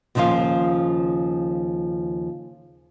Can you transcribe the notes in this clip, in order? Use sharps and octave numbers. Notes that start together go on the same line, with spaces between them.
D#2 C#3 F3 A3 F4 F5